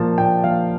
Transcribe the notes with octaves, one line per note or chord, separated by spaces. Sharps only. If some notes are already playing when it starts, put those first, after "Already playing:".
Already playing: A#2 F3 A#3 A5
A#2 G5
F3 A#3 F5